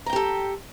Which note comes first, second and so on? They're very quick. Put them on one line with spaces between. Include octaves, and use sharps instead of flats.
A#5 G5 G4 A4